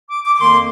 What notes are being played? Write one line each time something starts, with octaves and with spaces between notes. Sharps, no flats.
D6
D6
D6
F2 D#3 A#3 C6